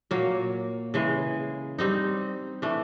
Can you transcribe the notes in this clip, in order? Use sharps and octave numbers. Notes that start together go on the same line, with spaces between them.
A#2 F#3 A#3
C#3 E3 G#3
G3 C4 D#4
E3 A3 D4